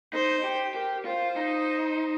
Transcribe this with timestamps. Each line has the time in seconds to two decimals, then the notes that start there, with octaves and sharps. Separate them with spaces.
0.13 D#4 C5
0.44 G4
0.74 G4 A#4
1.05 F4 C5
1.36 D#4